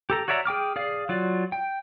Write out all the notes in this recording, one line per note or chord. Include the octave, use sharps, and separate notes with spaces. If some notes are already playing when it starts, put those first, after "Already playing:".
G4 A4 A#5
F#4 C#5 D5 E5 A#5
G#4 G5 D6 F6
G#4 D5 F5
F#3 F4 D5
G5